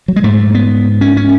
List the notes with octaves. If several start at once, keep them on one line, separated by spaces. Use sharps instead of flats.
F#3
G#3
G#2 A3
B3
C#4
C#4